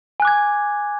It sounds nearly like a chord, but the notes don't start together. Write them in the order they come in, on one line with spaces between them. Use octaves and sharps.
G#5 F#6 D6 G#6